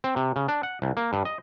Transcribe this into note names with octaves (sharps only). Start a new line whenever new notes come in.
C4
C3
C#3
D4
F#5
C2
A#3
G2
D#5